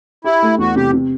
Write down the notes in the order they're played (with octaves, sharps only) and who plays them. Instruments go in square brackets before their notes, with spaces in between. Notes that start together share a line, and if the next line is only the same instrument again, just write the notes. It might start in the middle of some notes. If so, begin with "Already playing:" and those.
[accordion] E4 [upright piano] G4
[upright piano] A3
[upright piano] E2 [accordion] F#4
[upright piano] C3 [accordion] G4
[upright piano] C3